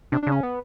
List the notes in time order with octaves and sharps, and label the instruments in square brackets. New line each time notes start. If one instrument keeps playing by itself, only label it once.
[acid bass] C3 [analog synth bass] D4
[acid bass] C#3 [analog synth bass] D4
[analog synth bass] C#4
B3